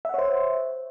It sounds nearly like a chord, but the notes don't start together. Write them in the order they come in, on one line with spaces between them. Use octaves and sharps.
E5 F#5 C#5 C5